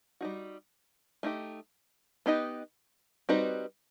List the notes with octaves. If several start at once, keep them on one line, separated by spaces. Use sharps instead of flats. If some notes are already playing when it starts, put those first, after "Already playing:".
G3 D#4 F#4
A3 D#4 G4
B3 D#4 G4 B4 D#5
G3 C4 D#4 F#4 B4